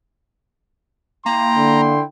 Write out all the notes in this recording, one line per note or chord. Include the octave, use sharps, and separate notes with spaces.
A#3 E4 G5 A#5 C6
D3